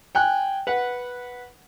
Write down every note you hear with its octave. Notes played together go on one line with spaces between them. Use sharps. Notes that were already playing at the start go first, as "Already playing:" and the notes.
G5 G#5 F#6
B4 F#5